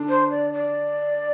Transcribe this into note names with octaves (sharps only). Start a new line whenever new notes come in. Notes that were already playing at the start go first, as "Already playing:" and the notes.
Already playing: D3 D4
C5
D5
D5